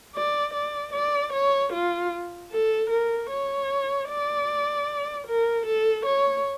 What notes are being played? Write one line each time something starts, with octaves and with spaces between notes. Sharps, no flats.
D5
D5
D5
C#5
F4
A4
A#4
C#5
D5
A#4
A4
C#5